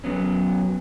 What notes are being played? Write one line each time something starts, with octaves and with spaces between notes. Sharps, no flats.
F#3 B3 C#4